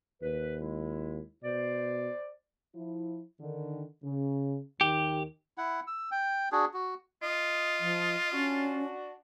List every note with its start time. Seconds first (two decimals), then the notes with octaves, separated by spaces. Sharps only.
0.22 D#2 B4
0.60 G#3 E4
1.43 B2 C5 D5
2.76 F3 E4
3.41 D3 D#3
4.03 C#3
4.81 D#2 D#3 G4
5.58 E4 F#5
5.87 E6
6.11 G5
6.52 D4 F#4 G#4
6.74 F#4
7.22 F4 D#5
7.80 F3
8.32 C#4 D4 F#4